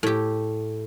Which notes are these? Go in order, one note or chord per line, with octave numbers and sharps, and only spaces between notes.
A2 G4